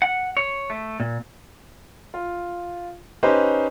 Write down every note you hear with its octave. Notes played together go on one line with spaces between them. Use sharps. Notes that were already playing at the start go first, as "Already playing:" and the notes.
F#5
C#5
A3
A#2
F4
C#4 D#4 G4 B4 C5 D#5